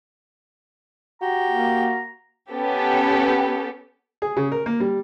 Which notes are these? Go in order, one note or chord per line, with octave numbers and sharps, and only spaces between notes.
F#4 G4 A#5
A#3
B3 C#4 G4 A4
G#4
C#3
A#4
A#3
G3